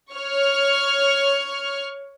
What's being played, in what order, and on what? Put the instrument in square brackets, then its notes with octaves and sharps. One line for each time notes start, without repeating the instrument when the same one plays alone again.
[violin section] C#5 C#6 F6